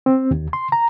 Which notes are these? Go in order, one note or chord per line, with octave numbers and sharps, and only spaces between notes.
C4
D#2
C6
A#5